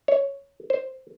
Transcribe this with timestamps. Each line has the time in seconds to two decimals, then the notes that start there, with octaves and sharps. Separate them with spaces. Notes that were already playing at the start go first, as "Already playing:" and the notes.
0.08 C#5
0.70 C5